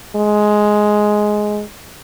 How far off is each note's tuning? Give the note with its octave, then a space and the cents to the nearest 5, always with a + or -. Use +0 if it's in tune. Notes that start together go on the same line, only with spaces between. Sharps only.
G#3 +10